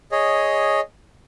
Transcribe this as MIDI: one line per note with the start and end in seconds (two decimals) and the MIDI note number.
0.12 0.80 68
0.12 0.80 73
0.12 0.80 75